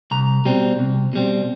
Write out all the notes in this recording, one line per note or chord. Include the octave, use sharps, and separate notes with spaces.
C2 A#5
B2 G3 C4
C2
B2 G3 C4